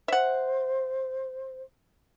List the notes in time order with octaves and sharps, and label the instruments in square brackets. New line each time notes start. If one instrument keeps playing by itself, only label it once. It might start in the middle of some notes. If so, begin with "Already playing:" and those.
[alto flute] C5 [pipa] E5 F#5